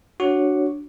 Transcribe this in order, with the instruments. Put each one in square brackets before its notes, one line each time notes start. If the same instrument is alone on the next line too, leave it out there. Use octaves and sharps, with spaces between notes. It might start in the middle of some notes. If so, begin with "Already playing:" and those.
[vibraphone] D4 C#5 [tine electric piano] F#4